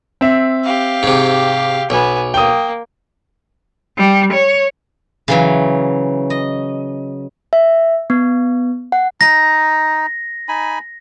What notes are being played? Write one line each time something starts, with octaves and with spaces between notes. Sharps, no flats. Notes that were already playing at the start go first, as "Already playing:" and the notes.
C4 E5
G4 F5
G#2 C3
B1 B3 G#5
A#3 G5 D#6
G3
C#5
C#3 E3 F#3
D#5
E5
B3
F#5
D#4 A#6
D#4 G#5 B5